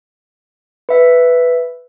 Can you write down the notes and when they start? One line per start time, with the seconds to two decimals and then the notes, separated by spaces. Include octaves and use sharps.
0.89 B4 E5